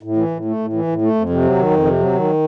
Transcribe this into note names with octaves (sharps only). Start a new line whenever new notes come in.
A2
E3
A2
A3
A2
E3
A2
A3
F2
C3
F#3
D#3
F2
C3
F#3
D#3